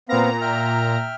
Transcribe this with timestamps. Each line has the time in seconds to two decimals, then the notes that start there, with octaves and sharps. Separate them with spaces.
0.09 A#2 B3 C4 F5 A#5
0.41 E5 G5 F6